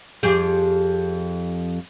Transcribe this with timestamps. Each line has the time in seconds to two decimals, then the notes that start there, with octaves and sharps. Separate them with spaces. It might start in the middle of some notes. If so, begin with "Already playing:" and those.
0.23 F2 G4 G#4